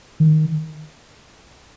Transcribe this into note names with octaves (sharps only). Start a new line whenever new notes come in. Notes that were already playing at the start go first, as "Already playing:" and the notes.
D#3